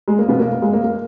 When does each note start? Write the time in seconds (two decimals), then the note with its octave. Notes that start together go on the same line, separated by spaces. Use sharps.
0.08 G#3
0.19 A#3
0.29 B2 B3
0.40 A#3
0.52 A#3
0.62 G#3
0.73 A#3
0.84 A#3